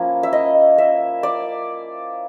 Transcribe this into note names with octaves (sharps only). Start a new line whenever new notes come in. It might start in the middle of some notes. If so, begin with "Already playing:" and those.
Already playing: F3 A#3 C#4 E4
E5
D#5
E5
D5